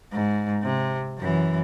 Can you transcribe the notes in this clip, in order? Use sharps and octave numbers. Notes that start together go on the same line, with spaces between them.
G#2
C3
F#2 E3